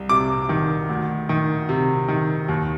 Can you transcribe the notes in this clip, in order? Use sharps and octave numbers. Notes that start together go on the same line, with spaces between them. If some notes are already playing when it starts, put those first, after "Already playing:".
Already playing: C2
C3 D6
D#3
D2
D#3
C3
D#3
D#2